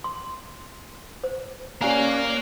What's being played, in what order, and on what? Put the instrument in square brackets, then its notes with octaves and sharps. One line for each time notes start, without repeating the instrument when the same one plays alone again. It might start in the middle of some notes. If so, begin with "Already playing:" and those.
[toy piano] C6
C5
[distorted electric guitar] A#3 F5 [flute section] C#4 D5 F#6 [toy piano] G4 G#5 A#5